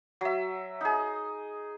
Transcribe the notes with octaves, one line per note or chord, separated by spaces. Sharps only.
F#3 E5
D#4 G#4